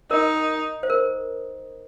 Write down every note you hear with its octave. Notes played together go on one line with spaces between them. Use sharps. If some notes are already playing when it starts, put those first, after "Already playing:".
D#4 A#4
C5
A#4